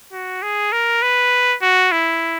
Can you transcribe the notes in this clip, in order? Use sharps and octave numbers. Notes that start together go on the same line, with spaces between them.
F#4
G#4
A#4
B4
F#4
E4